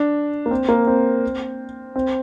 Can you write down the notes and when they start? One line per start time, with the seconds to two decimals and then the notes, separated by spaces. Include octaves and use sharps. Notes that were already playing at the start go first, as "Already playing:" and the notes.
Already playing: D4
0.46 A#3
0.51 C4
0.69 A#3
0.87 C4
1.96 C4